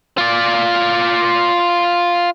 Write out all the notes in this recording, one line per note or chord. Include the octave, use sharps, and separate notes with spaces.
F4 D5